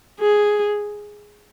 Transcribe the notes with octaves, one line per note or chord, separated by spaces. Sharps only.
G#4